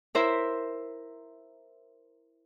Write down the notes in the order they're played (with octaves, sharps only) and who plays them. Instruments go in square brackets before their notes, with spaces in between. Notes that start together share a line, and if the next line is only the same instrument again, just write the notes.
[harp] E4 A#4 C5 E5